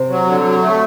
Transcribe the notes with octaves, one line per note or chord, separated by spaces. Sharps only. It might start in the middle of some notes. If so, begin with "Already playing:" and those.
Already playing: C3
F#3
D3
F#3
A3